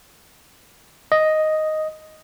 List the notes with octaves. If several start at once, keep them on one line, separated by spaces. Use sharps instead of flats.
D#5